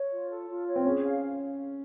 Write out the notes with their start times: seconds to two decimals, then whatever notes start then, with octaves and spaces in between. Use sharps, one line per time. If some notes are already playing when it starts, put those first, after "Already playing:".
Already playing: C#5
0.11 F4
0.30 A4
0.49 F4
0.67 C#5
0.76 C4
0.85 C#4 G#4
1.04 F5